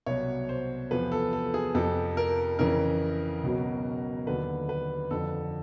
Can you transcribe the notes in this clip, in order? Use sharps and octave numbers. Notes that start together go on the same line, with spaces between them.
C2 B2 F#3 C#5
C5
E2 C3 F3 B4
A4
A4
G#4
F2 C3 F3 A4
A#4
F2 C#3 E3 A#4
C#2 B2 F#3
D#2 D3 F#3 B4
B4
F2 D3 F3 A4